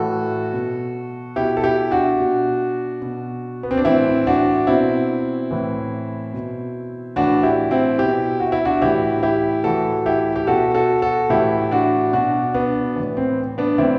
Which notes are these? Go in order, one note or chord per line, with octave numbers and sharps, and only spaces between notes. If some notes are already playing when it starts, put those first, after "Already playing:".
Already playing: A2 E3 F#4 A4
B2
B2 E4 G4
A4
E4 G4
D4 F#4
B2
B2
B3
C4
D4
A2 E3 C4 E4
D4 F#4
B2 C4 E4
A2 E3
B2
A2 E3 D4 F#4
E4 G4
C4 E4
B2 E4 G4
F#4
E4
D4 F#4
A2 E3 E4 G4
E4 G4
A2 E3 F#4 A4
E4 G4
G4
B2 F#4 A4
F#4 A4
F#4 A4
A2 E3 E4 G4
D4 F#4
B2 D4 F#4
B3 D4
A2 E3
C4
B3 D4
A2 E3 C4 E4